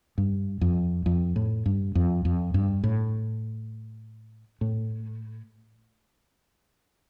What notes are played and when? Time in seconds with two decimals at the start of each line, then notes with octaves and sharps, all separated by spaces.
0.18 G2
0.61 F2
1.06 F2
1.36 A2
1.66 G2
1.95 F2
2.25 F2
2.54 G2
2.84 A2
4.61 A2